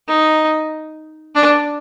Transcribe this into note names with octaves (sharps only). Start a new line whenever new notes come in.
D#4
D4